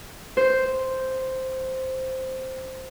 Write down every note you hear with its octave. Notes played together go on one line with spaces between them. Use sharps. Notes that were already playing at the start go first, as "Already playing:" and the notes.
C5 G6